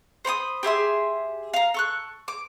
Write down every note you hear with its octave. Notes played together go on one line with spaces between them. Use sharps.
C5 B5 C#6 D#6
G4 G#4 E5 C6
F5 A#5
A4 C#6 F#6
D6